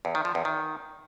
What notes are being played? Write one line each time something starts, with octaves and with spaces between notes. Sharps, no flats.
E2
D#3
F3
E2
D#3